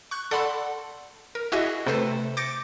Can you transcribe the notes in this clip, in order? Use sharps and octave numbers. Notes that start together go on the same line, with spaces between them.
C#6 F#6 G6
A4 D5 F#5 A5 B5 C6
A#4
E4 F#4 G#4 D#5 E5
C3 A3 A4 B4 C5
D6 G6 A6 A#6 C#7 D7